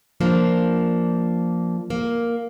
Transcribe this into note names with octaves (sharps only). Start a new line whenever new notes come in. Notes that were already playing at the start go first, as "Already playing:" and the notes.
F3 A#3 D4
A#3